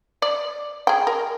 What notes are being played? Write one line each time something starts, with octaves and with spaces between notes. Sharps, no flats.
D5
G#4 G5
A#4